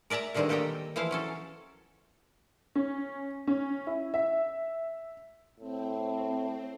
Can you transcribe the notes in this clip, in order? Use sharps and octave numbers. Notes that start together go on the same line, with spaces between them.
A#4 D5 E5 A5 A#5
B2 D3 D#3 G3 G#3 C4
A#3 G4 A4 D#5 G5
E3 F3 E4 C5 F5
F#3 C#4 A4
C#4
C#4
E4
E5
A2 C4